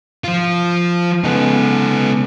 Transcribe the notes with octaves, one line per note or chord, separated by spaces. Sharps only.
F3 F4
C#3 G#3 B3 D#4 A4